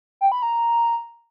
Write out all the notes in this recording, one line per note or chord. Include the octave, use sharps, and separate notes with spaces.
G5
B5
A#5